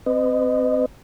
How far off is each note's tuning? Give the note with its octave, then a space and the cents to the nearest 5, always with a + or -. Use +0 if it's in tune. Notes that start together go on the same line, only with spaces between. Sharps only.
C4 -5 B4 +40 D#5 -20